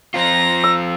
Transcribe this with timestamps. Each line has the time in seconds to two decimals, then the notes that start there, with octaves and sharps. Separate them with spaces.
0.14 F3 C4 F4 A#5 A#6
0.64 E6